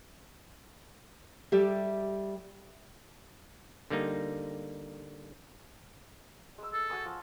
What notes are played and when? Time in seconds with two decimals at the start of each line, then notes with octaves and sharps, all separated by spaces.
1.52 G3 G4 A4 E5
3.90 D3 G3 A#3 D#4
6.58 G#3 E6
6.73 A4
6.90 F#4 G#5 D#6
7.05 F3